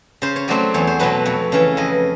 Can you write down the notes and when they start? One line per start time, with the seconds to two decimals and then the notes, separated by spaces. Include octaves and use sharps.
0.22 C#3 C5
0.36 C#5
0.48 F#3 A3 C4 D5
0.74 E2 C#5
0.87 C5
0.99 B2 F#3 A3 B4
1.26 F2 C#5
1.52 C#3 E3
1.77 F2 D#5